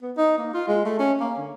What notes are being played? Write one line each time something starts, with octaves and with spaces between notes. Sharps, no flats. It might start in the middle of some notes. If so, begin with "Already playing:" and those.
B3
D#4
A#3
F4
G#3
A3
C#4
A#3
D3